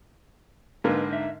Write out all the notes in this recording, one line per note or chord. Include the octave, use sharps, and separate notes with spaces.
G#2 D3 A#3 D#4 B4
D#4 E5